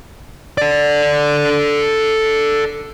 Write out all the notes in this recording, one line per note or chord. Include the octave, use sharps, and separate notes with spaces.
A4 D5